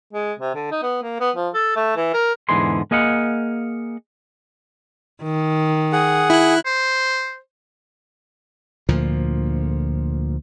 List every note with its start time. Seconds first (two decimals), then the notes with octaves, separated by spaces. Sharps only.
0.13 G#3
0.39 C3
0.55 D3
0.71 D#4
0.83 B3
1.03 A#3
1.20 B3
1.35 F3
1.54 A4
1.76 A3
1.96 E3
2.14 A#4
2.49 E2 G#2 D3 E3 G#4 C6
2.91 A#3 G#4 D#5 F5 F#5
5.23 D#3
5.92 G#4 F#5
6.30 E4 F#6
6.66 C5
8.89 D2 A#2 F3